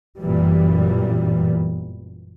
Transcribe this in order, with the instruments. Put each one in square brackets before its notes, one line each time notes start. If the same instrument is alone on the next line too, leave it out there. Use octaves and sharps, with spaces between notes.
[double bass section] G1 F#2 A#2 E3 G3